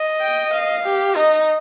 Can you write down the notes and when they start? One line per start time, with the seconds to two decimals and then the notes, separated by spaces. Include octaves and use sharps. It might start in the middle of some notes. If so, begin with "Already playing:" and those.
Already playing: D#5
0.20 G5
0.53 F5
0.85 G4
1.17 D#4 D#5